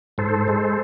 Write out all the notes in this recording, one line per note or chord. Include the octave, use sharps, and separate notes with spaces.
G#2 A4 C5
G#3